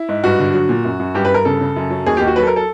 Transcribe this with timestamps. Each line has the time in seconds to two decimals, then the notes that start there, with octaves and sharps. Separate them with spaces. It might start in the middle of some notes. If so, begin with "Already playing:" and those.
Already playing: E4
0.09 G#2
0.24 G2 F#4
0.39 D3
0.54 F#3
0.69 A#2
0.85 F#2
1.00 F#2
1.15 G2 G4
1.25 B4
1.30 G2 A#4
1.45 C#3 A4
1.61 C#3
1.76 F#2
1.90 F#3
2.06 D#2 G#4
2.17 D#2 G4
2.27 F#4
2.36 F#3 B4
2.43 A4
2.47 A#4
2.56 A4